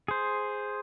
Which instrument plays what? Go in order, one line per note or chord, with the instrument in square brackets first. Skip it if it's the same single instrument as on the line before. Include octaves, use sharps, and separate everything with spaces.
[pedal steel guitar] G#4 C5